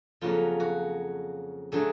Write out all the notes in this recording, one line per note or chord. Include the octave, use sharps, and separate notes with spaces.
F2 C#3 F#3 A#3 C#4 F4
F#4
D3 F#3 A3 G#4